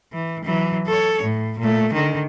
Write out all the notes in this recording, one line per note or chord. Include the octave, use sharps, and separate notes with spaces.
E3
E3 F#3
A4 C#5
A2
A#2 A3
D3 D#3